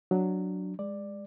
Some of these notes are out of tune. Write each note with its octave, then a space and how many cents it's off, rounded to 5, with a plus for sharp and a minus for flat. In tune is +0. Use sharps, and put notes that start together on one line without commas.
F#3 +0 D4 +0
G#3 -15 D5 +10